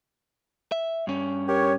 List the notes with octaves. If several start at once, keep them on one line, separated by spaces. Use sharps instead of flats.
E5
G2 C#4
G4 A#4 C#5